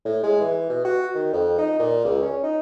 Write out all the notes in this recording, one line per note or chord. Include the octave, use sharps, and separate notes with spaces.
A2
G#3
E3
B2
F#4
D#3
F2
D#4
A#2
C#2
C#4
D#4